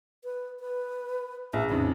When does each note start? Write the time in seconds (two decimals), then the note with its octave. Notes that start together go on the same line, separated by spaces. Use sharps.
0.24 B4
0.60 B4
1.53 A#1 E5
1.70 F2 C#3 D#4